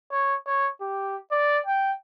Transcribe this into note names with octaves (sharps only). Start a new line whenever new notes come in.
C#5
C#5
G4
D5
G5